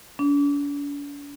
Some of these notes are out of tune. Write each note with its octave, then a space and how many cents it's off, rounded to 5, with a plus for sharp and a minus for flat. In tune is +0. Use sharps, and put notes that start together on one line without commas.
D4 -45